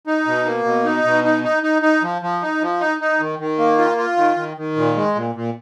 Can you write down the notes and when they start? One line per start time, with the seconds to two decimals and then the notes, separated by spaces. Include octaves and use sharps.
0.07 D#4
0.26 B2
0.46 A#3
0.64 B2
0.85 D#4
1.04 B2
1.24 D#4
1.44 D#4
1.63 D#4
1.82 D#4
2.02 F3
2.22 F3
2.42 D#4
2.61 F3
2.80 D#4
3.01 D#4
3.20 D#3
3.39 D#3
3.58 A#3
3.78 F4
3.97 F4
4.17 D#3
4.36 D#3
4.57 D#3
4.76 A#2
4.96 G#3
5.15 A#2
5.35 A#2